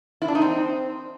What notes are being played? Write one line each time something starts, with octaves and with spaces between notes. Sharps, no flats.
E4
D4
D#4
C4